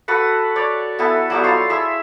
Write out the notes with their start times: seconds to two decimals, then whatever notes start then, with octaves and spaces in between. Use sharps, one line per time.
0.08 F#4 A4 B4 F#5
0.56 C#5 D5
0.99 B3 E4 A4 G#5
1.30 F#3 G3 B3
1.43 F4 C#5 C6
1.70 E4 G#4 E5